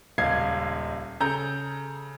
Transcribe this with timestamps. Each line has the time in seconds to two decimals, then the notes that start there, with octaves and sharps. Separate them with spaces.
0.18 D#1 C#2 F5 G#6 C7
1.20 C#3 A4 A#5 G6